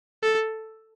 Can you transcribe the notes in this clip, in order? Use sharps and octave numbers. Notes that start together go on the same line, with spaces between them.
A4